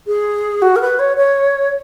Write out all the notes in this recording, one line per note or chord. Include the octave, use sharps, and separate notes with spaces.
G#4
F#4
A#4
B4
C#5
C#5